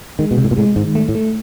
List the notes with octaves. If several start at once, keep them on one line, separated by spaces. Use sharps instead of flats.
D#3 G#3
B2
C3
A2
A#2
A2 G#3
G#2 D#3
A3
A2
A3